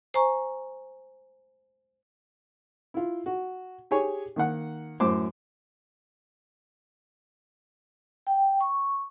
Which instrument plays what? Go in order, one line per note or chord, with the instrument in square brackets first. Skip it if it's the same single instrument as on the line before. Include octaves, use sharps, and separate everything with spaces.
[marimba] C5 G#5 A#5 C#6
[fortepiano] E4 F4
F#4
G4 G#4 C#5 G#5
D#3 A#3 F#5
F#2 A2 C5 D6
[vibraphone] G5
C#6